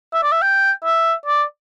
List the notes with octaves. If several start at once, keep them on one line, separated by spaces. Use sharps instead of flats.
E5
D5
E5
G5
E5
D5